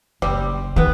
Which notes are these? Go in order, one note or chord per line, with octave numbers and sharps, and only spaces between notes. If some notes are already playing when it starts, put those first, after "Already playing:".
F#1 G3 C4
C3 D#3 B3